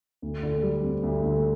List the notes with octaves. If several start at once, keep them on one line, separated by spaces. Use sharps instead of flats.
D2
D3
G3
C4
D2
D3